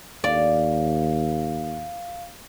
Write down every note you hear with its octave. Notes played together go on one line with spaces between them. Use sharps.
D#2 D5 F5